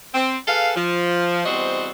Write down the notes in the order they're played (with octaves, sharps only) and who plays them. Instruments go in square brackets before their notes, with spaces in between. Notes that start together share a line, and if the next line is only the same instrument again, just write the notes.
[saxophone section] C4
G#4 A4 B4 F5
F3
E2 G3 C4 F#4 C5 D#5